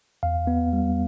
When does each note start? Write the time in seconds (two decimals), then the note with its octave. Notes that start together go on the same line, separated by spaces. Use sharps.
0.23 E2 F5
0.47 B3
0.73 G3